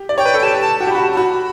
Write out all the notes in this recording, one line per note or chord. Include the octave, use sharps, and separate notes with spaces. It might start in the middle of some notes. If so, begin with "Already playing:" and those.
Already playing: G4
D5
C#5 G5
B4
A4
G4 A5
A5
F#4 G5
G4
B5
F#4 A5
A5
F#4 B5